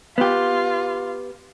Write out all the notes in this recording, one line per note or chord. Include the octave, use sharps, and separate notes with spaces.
B3 F4 G4